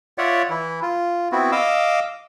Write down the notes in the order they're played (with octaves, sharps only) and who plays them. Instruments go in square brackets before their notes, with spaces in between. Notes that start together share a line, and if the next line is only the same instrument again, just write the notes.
[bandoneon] F4 C#5 D5 E5 F#5
E3 E4
F4
B3 C4 E4 F#4
D#5 F5 D6 E6